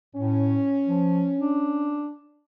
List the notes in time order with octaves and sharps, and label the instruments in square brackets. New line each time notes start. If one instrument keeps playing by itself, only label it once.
[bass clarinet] A2 [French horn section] C#4
[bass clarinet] F3
D4